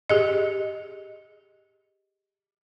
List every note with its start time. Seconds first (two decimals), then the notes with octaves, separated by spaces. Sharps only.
0.10 G4 G#4 D#5